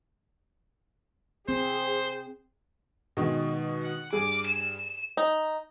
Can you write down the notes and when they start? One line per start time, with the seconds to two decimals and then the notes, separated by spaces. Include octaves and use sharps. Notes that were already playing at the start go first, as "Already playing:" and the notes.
1.49 C4 G#4 C5
3.17 B2 D#3 G#3
3.82 F#5
4.13 G2 G#4 D6
4.47 E7
5.17 D#4